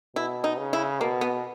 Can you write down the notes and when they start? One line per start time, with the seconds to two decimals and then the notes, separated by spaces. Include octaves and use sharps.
0.16 B2 E4
0.44 D#4
0.58 C#3
0.73 E4
1.00 B2 A#3
1.21 B3